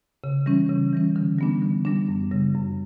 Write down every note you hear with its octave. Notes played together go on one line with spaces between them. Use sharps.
C#3
E3 G3 C#4
C#3
E3 G3 C#4
D3
G3 B3 D4
D3
G3 B3 D4
F#2
C#3 G3
F#2